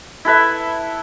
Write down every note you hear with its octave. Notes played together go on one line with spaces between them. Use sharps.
E4 A4 B4 E5